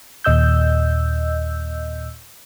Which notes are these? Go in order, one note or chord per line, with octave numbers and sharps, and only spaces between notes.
D#2 A#2 D#5 E6 G6